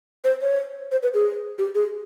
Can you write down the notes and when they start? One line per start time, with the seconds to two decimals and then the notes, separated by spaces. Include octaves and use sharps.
0.24 C5
0.42 C#5
0.92 C5
1.03 B4
1.14 G#4
1.58 G4
1.75 G#4